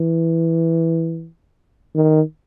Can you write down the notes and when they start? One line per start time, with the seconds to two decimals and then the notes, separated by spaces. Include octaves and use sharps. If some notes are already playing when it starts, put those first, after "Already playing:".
Already playing: E3
1.95 D#3